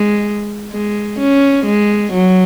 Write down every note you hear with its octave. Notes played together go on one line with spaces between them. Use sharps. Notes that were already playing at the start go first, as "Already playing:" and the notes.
Already playing: G#3
G#3
C#4
G#3
F#3